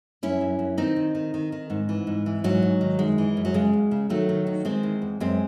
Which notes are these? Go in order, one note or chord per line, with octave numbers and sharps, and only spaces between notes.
F#2 C#4 E4
F#2
F#2
D#3 C4 D#4
D#3
D#3
D#3
D#3
G#2
E3
G#2
E3
G#2 F#3
G#2
D#3
F#2 G#3
E3
F#2
F#3
C#3 G#3
E2
C#3
D#3 F#3 A3
D#3
D#3
D#3 G#3 C4
E2
E2
F#2 G#3 C4